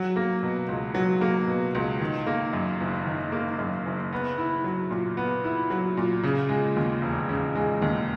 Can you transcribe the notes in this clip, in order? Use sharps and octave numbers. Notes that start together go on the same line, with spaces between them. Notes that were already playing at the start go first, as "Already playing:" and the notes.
Already playing: F#3
A#3
B2
C#2
F#3
A#3
B2
C#2
D#3
A#3
F#2
F#1
D#3
A#3
F#2
F#1
B3
E4
F#3
A#2
B3
E4
F#3
A#2
C#3
G#3
D#2
E1
C#3
G#3
D#2